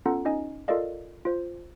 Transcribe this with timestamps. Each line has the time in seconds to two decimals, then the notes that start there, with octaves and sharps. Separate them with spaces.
0.06 B3 C#4 F4 A4 F#5 A#5
0.25 C#4 D#4 D#5 G#5
0.68 F4 A4 A#4 D5 D#5 F5
1.25 F4 C5